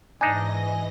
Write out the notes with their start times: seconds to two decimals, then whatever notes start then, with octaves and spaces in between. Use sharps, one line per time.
0.21 G#2 E3 D4 D#4 D#5 G#5 A#6